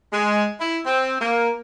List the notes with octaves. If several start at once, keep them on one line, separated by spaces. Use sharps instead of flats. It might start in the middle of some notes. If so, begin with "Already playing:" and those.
G#3
E4
C4
A#3